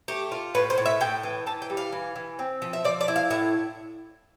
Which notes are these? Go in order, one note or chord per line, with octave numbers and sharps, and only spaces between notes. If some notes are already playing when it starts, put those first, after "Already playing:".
A3 G4
F4
A2 B4
C5
A2
E5
A2 G5
E3
E3 A5
G5
G3
F5
E3
E3
C4
F3
E5
F3 D5
D5
E4
F5
A2 E5